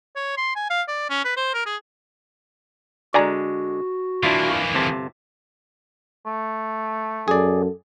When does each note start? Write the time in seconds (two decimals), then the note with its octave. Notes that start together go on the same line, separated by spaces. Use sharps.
0.16 C#5
0.37 C6
0.56 G#5
0.70 F5
0.88 D5
1.10 C#4
1.25 B4
1.37 C5
1.54 A#4
1.66 G#4
3.14 D3 G#3 F#4 D5 G#5 A#5
4.23 E3 A#3 D4 E4 F4
4.74 G1 C3 A5
6.26 A3
7.28 F#2 G#4 A4 D5